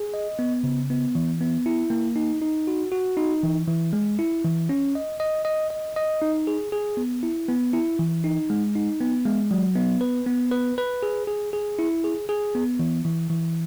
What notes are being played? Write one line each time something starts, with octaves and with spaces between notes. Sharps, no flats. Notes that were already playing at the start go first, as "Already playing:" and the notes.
Already playing: G#4
D#5
B3
C#3
B3
E3
B3
E4
A#3
D#4
D#4
F#4
F#4
D#4
E3
E3
G#3
E4
E3
C#4
D#5
D#5
D#5
D#5
D#5
D#4
G#4
G#4
B3
E4
B3
E4
E3
D#4
G#3
D#4
B3
G#3
F#3
B3
B4
B3
B4
B4
G#4
G#4
G#4
E4
G#4
G#4
B3
E3
E3
E3